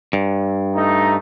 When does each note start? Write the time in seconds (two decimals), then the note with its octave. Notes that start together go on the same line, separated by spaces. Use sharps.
0.13 G2
0.76 A3 D#4